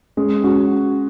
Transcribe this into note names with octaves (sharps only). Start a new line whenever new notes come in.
G#3 C#4
C#4 F#4